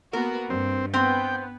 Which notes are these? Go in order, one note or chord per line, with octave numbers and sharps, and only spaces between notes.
A#3 B3 F#4 A#4
G2 C4
B3 C4 G5